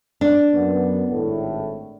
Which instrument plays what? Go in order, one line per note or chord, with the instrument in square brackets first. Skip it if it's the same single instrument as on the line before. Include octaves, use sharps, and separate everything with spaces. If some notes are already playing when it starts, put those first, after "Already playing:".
[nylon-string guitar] D4
[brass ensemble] F#2 B3
G#1 A2